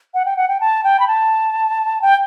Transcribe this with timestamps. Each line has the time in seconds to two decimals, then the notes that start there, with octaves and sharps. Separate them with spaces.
0.14 F#5
0.25 G5
0.37 F#5
0.48 G5
0.60 A5
0.84 G5
1.00 B5
1.08 A5
2.02 G5